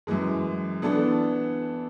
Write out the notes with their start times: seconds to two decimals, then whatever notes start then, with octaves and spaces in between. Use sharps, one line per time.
0.07 F#2 E3 G#3
0.82 E3 B3 D4 A4